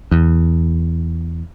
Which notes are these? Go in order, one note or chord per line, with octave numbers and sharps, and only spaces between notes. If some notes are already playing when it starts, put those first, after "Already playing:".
E2